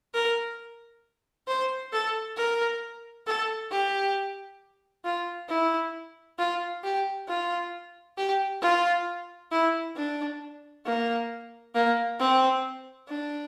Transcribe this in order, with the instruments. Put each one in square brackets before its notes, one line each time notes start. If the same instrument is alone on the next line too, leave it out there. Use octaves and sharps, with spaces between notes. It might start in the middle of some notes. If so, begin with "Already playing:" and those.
[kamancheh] A#4
C5
A4
A#4
A4
G4
F4
E4
F4
G4
F4
G4
F4
E4
D4
A#3
A#3
C4
D4